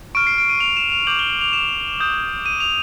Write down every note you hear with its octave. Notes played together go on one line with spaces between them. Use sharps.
C#6 F6 D7
C7
D7
D#7
F7
E7
F7
D6 G6 F#7
G7
F#7
F7
E7
D#6 G6
D#7
F7